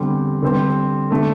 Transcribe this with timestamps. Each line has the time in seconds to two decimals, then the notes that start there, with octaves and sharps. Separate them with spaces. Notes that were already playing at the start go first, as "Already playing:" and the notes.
Already playing: E2 D3 G3 C4
0.42 D3 G3 C4
1.10 D3 A3 D4 A4